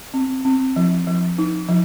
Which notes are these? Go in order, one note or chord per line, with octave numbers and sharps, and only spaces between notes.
C4
C4
F3
F3
D#4
F3